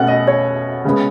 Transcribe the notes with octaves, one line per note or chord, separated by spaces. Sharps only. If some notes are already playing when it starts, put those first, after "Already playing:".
Already playing: B2 A3 C#4 F#5
D#5
C#5
C#3 G#3 B3